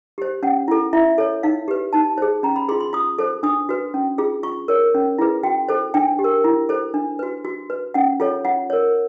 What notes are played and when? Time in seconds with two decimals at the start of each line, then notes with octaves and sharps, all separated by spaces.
0.18 G4 C5
0.43 C#4 F#5
0.68 E4 A4
0.93 E4 E5
1.18 A4 C#5
1.43 D#4 F5
1.68 G4 B4
1.93 D#4 A5
2.18 G#4 C5
2.43 C#4 A#5
2.56 B5
2.69 G#4 C6
2.71 F4
2.80 C6
2.93 F4 D#6
3.19 A4 C5
3.43 D4 D#6
3.69 F#4 B4
3.94 C#4
4.18 F4 G#4
4.43 F4 C#6
4.68 A#4 C#5
4.95 C#4
5.18 E4 G#4 B4
5.43 F#4 G5
5.69 A4 C5
5.94 D4 G5
6.19 G4
6.24 A#4
6.44 E4
6.69 A4 C5
6.94 D4
7.19 F#4 B4
7.45 F#4
7.70 B4
7.94 C#4 F#5
8.20 F4 A4 C#5
8.45 F4 F#5
8.70 A#4 C#5